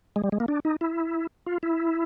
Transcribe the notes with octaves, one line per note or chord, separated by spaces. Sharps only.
G#3
G3
G#3
A#3
D4
D#4
E4
F4
E4